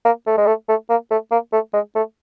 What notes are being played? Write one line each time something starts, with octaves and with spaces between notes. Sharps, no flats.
A#3
A3
G#3
A3
A3
A#3
A3
A#3
A3
G#3
A3